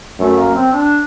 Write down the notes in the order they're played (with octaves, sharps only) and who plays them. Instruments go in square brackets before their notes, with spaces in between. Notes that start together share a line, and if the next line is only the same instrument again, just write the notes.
[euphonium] F#2 [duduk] A3
[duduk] A#3
C4
D4